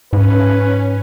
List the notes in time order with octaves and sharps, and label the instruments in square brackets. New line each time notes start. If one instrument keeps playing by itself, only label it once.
[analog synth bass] G#2 [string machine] C#4 [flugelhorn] B4